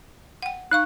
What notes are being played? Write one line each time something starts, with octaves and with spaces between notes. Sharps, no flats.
F#5 G5
D#4 F5 C#6 F#6